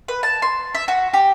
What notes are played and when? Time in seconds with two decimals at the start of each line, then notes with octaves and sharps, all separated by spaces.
0.08 B4
0.23 A5
0.42 C6
0.75 E5
0.88 F#4
1.14 G4